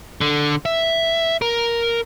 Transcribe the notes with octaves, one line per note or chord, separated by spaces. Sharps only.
D3
E5
A#4